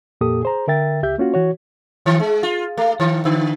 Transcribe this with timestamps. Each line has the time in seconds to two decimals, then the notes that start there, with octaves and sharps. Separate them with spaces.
0.21 F2 A#2 A#3 G4 A4 D#6
0.43 G#4 C5 A#5
0.68 D3 A#4 E5 G5 A6
1.03 C#2 G4 E5 G6
1.18 A#3 C#4 F4 F#4
1.34 E3 F#4 C#5
2.06 D#3
2.20 G#3
2.43 F4
2.78 A3
3.00 D#3
3.25 D3